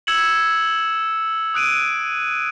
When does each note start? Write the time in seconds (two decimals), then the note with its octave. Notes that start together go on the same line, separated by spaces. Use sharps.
0.07 E6 G#6 C#7 E7 F#7
1.54 D#6 F#6 D7 D#7